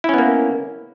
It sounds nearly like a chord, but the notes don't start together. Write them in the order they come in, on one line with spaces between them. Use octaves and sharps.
E4 C#4 B3 A#3